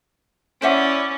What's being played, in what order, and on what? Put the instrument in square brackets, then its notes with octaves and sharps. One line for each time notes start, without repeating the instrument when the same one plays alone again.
[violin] C#4 [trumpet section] E4 D5 [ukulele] C5 E5 F#5